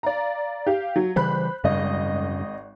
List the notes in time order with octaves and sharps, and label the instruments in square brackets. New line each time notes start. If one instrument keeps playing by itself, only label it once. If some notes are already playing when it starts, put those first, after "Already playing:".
[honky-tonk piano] D5 F5 A#5
G4 F5
F#3
[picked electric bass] C#3 E3 G3 [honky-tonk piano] C5 B5 F#6
[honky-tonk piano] G#1 D#5 [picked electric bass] F#2 C#3 G3